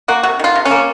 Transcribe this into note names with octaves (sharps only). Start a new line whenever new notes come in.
A#3 F#4
C3 F#4
D#3 F4
C3
C#4
A#3